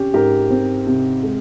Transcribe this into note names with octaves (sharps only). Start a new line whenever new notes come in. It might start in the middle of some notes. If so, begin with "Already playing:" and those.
Already playing: C3 C#4 G4
G#2 G4 A#4
C4
C3
G#3